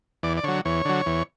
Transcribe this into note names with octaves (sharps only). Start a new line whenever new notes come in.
E2 D5
D5
D3 F#3 C#5
E2 C#5
D3 F#3
E2